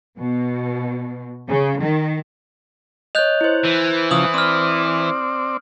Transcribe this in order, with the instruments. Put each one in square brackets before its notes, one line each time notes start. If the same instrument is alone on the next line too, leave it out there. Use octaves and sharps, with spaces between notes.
[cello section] B2
C#3
D#3
[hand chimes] C#5 D#5 [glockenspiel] F#6 G6 F7
[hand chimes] E4 C5
[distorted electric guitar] E3
[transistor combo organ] C#3 F3 [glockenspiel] D#6 F#7
[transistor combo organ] C4 D5 [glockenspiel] D#6 F6